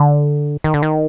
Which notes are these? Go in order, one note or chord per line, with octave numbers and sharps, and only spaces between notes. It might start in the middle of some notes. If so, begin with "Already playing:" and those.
Already playing: D3
D#3
D3
D#3